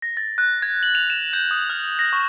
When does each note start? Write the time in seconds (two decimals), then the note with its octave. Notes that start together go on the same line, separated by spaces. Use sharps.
0.02 A#6
0.17 A6
0.38 F#6
0.62 G#6
0.83 F#7
0.95 F7
1.10 E7
1.33 G6
1.51 D#6
1.70 F6
1.99 A#6
2.13 C#6